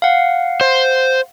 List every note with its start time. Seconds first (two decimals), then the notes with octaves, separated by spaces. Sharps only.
0.02 F5 F#5
0.61 C5